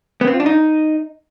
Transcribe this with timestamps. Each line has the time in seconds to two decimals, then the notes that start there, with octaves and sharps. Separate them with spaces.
0.21 B3
0.27 C4
0.34 F4
0.40 D4
0.46 D#4